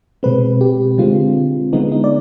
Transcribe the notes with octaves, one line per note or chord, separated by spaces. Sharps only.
B2 G#3 C4 B4
G4
D3 G#3 C4 F4
D3 G#3 B3 D#4
D#4
D5